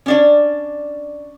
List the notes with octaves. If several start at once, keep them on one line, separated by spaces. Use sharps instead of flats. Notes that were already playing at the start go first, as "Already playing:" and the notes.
C#4 D4 D5